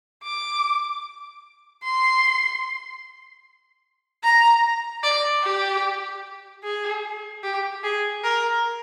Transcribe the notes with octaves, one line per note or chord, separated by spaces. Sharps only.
D6
C6
A#5
D5
G4
G#4
G4
G#4
A#4